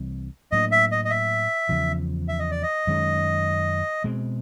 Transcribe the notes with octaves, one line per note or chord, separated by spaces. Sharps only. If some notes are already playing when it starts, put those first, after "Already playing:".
Already playing: C2 C3 E3 G3
A2 F#3 A#3 D4 D#5
E5
D#5
D#5
E5
E2 C#3 F3
E5
D#5
D5
D#5
F#2 D#3 G#3 C#4
B2 G#3 C4